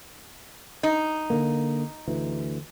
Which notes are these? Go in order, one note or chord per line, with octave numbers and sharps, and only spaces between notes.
D#4
D3 A#3
D2 E3